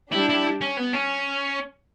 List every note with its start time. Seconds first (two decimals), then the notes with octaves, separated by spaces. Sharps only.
0.12 G3 D4 E4 G4
0.29 E4
0.61 C#4
0.77 B3
0.93 C#4